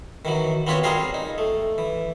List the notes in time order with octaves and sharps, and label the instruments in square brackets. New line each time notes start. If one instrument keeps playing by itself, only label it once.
[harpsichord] D#3 E3 F#3
B3 C4 F4 F#4 B4 C#5
G3 C4 F4 G#4 A#4 F5
D#4
A3
E3